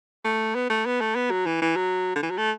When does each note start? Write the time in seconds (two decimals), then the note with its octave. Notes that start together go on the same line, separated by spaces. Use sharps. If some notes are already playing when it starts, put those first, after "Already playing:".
0.25 A3
0.55 B3
0.70 A3
0.86 B3
1.01 A3
1.15 B3
1.30 F#3
1.46 E3
1.61 E3
1.76 F#3
2.15 D3
2.23 E3
2.30 F#3
2.37 A3